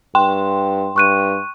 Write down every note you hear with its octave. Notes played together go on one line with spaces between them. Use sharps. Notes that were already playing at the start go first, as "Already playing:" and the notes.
G2 G5 C6
G2 C#6 F#6 D#7